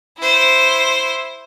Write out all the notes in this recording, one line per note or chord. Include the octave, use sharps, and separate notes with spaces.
E4 C5